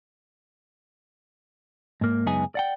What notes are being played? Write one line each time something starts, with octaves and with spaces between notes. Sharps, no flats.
G#2 A#3
C#2 F#2 B3 D#4 G#4 G#5
D5 F#5 G5